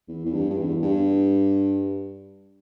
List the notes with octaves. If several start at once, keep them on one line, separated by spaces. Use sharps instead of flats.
E2
E2
G2
G2
E2
G2